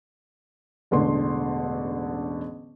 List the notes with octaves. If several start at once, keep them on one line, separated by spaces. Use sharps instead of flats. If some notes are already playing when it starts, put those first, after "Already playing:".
E1 A1 D3 C6